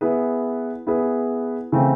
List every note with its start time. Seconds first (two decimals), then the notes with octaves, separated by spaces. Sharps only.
0.01 B3 E4 G#4 B4
0.87 B3 E4 G#4 B4
1.72 C#3 E3 A3 C4